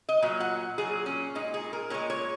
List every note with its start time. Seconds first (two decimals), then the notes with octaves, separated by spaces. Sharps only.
0.09 D#5
0.22 A#2 F#3
0.40 F#5
0.78 A#2 F#3 G#4
1.06 C#4
1.35 A#2 G#3 D#4
1.54 G#4
1.73 A#4
1.90 A#2 G#3 C#5
2.10 C#5